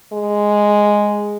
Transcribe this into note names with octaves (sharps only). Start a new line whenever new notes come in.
G#3